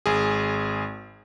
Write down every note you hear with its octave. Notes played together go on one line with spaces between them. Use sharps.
G#1 G#4